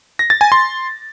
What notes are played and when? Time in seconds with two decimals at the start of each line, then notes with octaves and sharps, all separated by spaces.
0.19 A#6
0.30 A6
0.41 G#5
0.52 C6